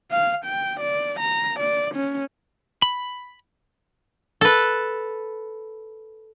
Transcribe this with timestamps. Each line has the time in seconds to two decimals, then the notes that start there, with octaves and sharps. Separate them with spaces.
0.11 F5
0.46 G5
0.81 D5
1.20 A#5
1.60 D5
1.95 C#4
2.82 B5
4.41 A4 B4